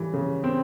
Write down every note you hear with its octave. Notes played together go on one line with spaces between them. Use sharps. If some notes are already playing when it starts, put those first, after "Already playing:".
Already playing: C#3 E3 G3
C#3
C4